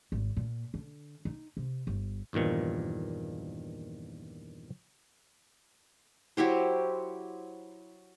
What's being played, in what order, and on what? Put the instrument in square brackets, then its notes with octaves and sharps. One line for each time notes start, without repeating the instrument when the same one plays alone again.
[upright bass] G#1
A#2
D3
D#4
C3
G1
[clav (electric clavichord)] E2 G2 A#2 D#3 F3
[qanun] F#3 E4 G4 C5